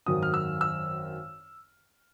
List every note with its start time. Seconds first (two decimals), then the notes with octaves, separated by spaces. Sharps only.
0.06 G#1 F#2 D#3 F#3 D#6
0.23 F6
0.34 E6
0.61 E6